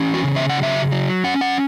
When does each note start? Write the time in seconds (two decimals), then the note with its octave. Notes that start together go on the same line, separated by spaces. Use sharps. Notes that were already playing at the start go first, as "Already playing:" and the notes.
Already playing: E3 C#4
0.14 F#4
0.24 C#3
0.36 E5
0.49 F#5
0.58 F#3
0.63 E5
0.91 F#3
1.24 C#4 F#5
1.41 F#5